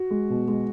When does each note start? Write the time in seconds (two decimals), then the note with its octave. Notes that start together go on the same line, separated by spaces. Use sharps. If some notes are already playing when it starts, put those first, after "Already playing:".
Already playing: F#4
0.10 G#3
0.30 B2
0.48 G#3